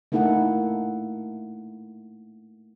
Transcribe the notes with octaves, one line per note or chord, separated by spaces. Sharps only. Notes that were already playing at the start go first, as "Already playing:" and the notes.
A3 A#3 D#4 E4 A4 F#5